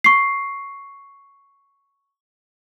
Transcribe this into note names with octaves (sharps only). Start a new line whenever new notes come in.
C#6 C7